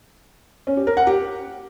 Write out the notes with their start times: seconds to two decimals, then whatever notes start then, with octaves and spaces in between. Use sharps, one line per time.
0.67 C#4
0.77 G4
0.87 A#4
0.97 F#5
1.07 G4